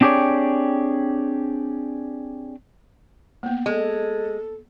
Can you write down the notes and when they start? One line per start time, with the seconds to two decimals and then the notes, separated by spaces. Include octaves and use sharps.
0.01 C4 D4 G4 G#4 C#5 D5
3.43 A#3 B3
3.66 G#3 A4